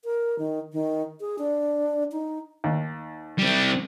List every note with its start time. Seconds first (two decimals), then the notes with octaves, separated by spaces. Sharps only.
0.05 A#4
0.39 D#3
0.73 D#3
1.20 G#4
1.39 D4
2.12 D#4
2.64 D#2
3.39 G3 C4